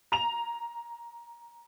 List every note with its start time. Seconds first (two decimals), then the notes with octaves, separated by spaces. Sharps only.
0.12 A#5 F7